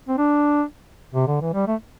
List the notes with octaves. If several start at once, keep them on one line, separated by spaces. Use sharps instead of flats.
C4
D4
C3
D3
E3
G3
A3